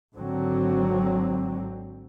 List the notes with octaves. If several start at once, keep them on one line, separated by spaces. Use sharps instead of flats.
G#1 D3 F#3 C4